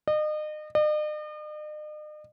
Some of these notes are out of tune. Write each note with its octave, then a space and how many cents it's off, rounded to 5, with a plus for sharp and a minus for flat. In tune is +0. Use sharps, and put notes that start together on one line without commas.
D#5 -35
D#5 -45